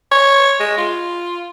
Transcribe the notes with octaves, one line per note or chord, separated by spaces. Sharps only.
C#5
G#3
F4